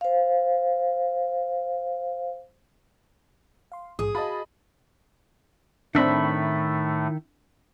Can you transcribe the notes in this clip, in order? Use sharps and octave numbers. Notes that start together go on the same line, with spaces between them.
C5 F5
F5 C6
A#1 G#2 G#4 G#5 D#6
F#4 D#5 F5 A5 B5 A6
A2 D#3 A3 C4 D4 E5 B5